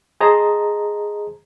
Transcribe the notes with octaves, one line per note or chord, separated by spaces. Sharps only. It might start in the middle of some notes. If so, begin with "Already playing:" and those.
G#4 C5 D#5 A5 A#5